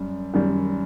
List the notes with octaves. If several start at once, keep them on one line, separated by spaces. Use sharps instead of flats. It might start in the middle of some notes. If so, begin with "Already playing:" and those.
Already playing: F#2 G3
F#2 D#3 G3